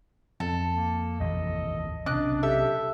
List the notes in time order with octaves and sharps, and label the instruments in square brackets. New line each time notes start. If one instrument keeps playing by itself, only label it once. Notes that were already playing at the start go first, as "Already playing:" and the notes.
[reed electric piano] F2 [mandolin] A4
[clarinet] A#3
[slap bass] A1 D#2 C3 [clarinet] D#5
[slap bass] B1 C3 C#4 [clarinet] D4 [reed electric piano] D#5 D6 [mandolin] F#6
[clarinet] G4 [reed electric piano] A4 [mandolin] E5